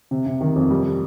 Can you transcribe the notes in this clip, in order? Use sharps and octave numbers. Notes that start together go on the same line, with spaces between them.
C3
C3
D#3
F2
G3